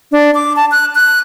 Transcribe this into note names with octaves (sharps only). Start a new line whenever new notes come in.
D4
D6
A5
F#6
F#6